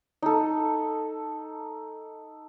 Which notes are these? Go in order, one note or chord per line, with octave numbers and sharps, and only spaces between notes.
D#4 A4